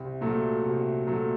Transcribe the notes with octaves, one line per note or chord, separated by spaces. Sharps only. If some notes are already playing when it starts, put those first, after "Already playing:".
Already playing: C2
A#2 F#3 A3
C2
A#2 F#3 A3